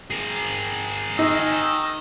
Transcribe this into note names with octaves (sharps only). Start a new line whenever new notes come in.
G#4 A#4
D#3 D#4 D#5 E6